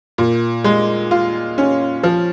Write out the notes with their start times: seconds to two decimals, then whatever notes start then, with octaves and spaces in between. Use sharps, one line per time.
0.18 A#2
0.64 G#3
1.11 F4
1.58 C#4
2.03 F3